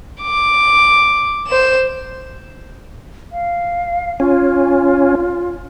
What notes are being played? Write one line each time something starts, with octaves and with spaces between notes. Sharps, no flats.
D6
C5 E7
F5
C#4 F4